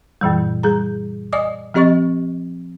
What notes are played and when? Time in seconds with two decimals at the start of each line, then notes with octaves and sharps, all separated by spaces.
0.21 F#2 A#2 E3 G3
0.63 G3 G#4 A#5
1.33 D5 D#5 G#5 D6 D#6
1.74 F3 C4 G4 D#5 C#6 A6